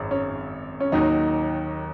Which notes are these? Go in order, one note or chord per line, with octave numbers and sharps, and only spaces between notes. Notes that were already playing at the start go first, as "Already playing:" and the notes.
Already playing: G#1 F#2
C#4
C#4
D#2 D#3 F#3 D#4